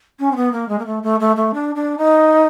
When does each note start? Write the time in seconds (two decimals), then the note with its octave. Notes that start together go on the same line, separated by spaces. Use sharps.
0.19 C#4
0.32 C4
0.36 B3
0.52 A#3
0.69 G#3
0.79 A#3
0.86 A3
1.03 A3
1.20 A3
1.36 A3
1.54 D4
1.75 D4
1.98 D#4